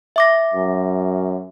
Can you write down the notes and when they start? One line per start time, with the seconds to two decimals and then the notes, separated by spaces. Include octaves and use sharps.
0.16 E5 D6 A#6
0.53 F#2